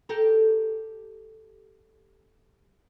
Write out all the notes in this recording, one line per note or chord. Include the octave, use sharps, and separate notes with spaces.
G4 A4 A#4